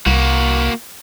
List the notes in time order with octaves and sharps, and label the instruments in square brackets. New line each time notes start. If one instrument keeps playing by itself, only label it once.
[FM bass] C2 [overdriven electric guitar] A#3 F#4